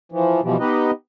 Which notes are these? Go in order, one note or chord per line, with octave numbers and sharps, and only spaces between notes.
E3 F3
B2 E3 F3 G3
B3 D#4 G4 B4 D#5